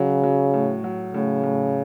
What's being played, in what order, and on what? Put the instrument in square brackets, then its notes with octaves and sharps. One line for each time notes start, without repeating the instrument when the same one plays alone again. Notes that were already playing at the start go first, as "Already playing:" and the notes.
Already playing: [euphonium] C#3 [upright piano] F#3
[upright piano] F#3
A2
F#3
[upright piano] A2 [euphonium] C#3
[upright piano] A2